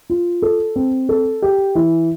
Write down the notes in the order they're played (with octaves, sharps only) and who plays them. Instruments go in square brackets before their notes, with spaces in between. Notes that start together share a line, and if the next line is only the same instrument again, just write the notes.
[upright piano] F4
A4
C4
A4
G4
E3